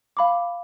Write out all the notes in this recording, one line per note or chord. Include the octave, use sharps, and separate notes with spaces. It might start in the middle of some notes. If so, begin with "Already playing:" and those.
F5 B5 D6